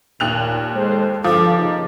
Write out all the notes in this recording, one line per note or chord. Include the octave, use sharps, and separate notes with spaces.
D#2 A#2 F#6 F7
G#3 A4 C5
G1 F3 A4 F5 D6
C#3 A#3 D#4